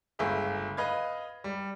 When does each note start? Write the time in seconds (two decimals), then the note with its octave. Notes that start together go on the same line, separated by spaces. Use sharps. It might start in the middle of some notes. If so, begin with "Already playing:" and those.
0.19 G1 C#2 A3 G#4 E5 F5
0.77 B4 D#5 F5 B5 G#6
1.44 G3